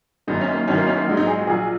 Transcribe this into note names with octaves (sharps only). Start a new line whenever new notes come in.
F#1 F#2 D#3 D#4
C#4
A#3
F#1 F#2 D#3 F#3 C#4
A#3
C#4
A#3
A#1 G#2 F#3
D#4
G#4
F#4
A#1 A#2 F#3 G#4